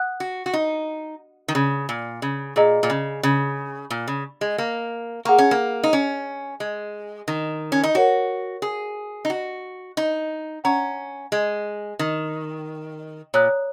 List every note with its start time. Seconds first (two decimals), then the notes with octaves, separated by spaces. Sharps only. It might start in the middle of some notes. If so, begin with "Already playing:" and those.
Already playing: F#5 D#6 F#6
0.20 F#4
0.46 F#4
0.53 D#4
1.48 D#3
1.55 C#3
1.89 A#2
2.22 C#3
2.56 A#2 G#4 D#5 A#5
2.83 A#2
2.90 C#3
3.23 C#3
3.90 A#2
4.08 C#3
4.41 G#3
4.58 A#3
5.25 A#3 G#4 F#5 A#5 C#6
5.38 C#4
5.51 A#3
5.83 D#4
5.93 C#4
6.60 G#3
7.28 D#3
7.72 C#4
7.83 D#4
7.95 F#4 A#4 C#5 F#5
8.62 G#4
9.25 D#4
9.30 F#4
9.97 D#4
10.64 C#4 F#5 A#5 C#6
11.32 G#3
11.99 D#3
13.34 A#2 C#5 A#5 D#6 F#6